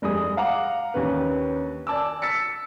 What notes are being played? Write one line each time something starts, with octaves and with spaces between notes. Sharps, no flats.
F1 G2 G#3 D#6
F5 F#5 A#5 D6
D#2 C#4 D4 B4
D5 G#5 A5 D6 E6
E6 A6 B6 C#7